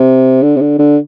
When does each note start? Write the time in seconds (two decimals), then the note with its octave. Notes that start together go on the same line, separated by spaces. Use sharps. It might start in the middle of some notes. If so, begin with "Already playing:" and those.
Already playing: C3
0.42 D3
0.56 C3
0.61 D3
0.79 D3